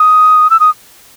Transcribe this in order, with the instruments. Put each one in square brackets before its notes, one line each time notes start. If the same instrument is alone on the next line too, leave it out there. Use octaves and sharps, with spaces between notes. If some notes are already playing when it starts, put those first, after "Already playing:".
Already playing: [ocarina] D#6
E6
D#6